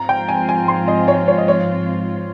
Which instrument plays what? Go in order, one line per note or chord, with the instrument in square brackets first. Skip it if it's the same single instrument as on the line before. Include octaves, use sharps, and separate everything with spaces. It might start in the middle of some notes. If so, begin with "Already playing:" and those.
Already playing: [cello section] G#2 F3 C4 F4 [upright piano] A#5
[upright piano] G5
G#5
G#5
C6
D#5
C#5
C#5
D#5
C#5